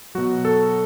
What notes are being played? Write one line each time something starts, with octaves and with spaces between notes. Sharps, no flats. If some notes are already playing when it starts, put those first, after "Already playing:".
B2 F#3 F#4
A4